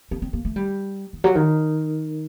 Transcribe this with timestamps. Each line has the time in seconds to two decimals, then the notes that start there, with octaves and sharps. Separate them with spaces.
0.11 C4
0.22 C4
0.33 A#3
0.45 A3
0.56 G3
1.13 D#3
1.24 F#3
1.35 D#3